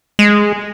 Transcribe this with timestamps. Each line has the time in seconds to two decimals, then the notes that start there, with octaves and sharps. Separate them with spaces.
0.19 G#3